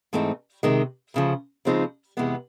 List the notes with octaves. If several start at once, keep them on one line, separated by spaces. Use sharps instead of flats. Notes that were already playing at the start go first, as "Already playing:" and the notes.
G#2 E3 A3 C4 D#4
C3 D#3 G#3
D2 C#3 F3
C#3 F3 G#3 C4 D#4
E2 C3 E3 G#3 B3